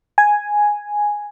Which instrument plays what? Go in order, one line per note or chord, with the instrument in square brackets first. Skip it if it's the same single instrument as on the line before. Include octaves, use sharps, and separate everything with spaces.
[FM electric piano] G#5